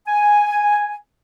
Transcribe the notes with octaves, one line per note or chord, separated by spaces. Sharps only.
G#5